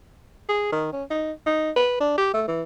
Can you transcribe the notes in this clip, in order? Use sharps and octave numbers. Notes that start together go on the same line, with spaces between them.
G#4
D#3
C#4
D#4
D#4
B4
D4
G4
A3
E3